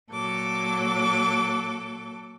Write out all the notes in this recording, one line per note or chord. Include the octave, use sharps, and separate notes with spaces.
A#2 F#3 A4 D6